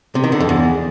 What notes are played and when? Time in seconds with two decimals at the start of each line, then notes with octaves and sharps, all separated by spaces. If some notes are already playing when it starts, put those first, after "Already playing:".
0.15 C3
0.24 D#3
0.32 D3
0.40 F2
0.49 E2